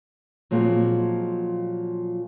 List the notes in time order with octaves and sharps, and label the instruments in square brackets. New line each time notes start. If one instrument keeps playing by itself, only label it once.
[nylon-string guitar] A#2 F3 F#3 G#3 A#3 C4